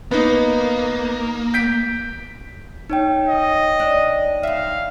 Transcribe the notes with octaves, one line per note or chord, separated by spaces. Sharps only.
A#3 B3 D#4
G6 B6 D7
D#4 C#5 G5
D#5
D4
F#2 E5 F5